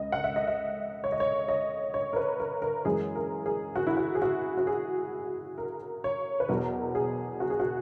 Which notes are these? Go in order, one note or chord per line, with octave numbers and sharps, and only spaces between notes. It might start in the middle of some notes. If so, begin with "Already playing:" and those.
Already playing: C#2 C#3 D#5
F#5
E5
D#5
E5
C#5
D#5
C#5
D#5
C#5
A#4
B4
A#4
A#4
F#2 E3 G#3 G#4
A#4
G#4
F#4
E4
F#4
G#4
F#4
F#4
G#4
A#4
C#5
B4
E2 B2 F#3 A#4
G#4
F#4
G#4
F#4